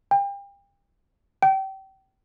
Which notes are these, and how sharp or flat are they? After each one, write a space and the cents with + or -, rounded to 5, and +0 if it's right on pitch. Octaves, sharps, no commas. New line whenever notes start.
G5 +35
G5 -30